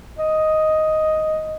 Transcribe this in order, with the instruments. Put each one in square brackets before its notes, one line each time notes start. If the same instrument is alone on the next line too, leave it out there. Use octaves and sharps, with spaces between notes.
[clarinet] D#5